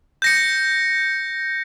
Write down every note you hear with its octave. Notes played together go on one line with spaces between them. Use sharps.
G6 A#6 C#7